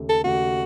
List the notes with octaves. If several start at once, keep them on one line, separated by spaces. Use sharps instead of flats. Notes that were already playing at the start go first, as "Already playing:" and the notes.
Already playing: D#2 C#3 A3
A4
D#2 C#3 A3 F#4